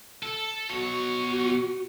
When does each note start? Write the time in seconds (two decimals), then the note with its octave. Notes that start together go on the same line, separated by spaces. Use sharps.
0.23 A4
0.70 B2 F#4 C#5